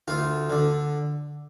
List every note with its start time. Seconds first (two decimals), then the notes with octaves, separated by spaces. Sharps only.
0.08 D2 F4
0.50 D3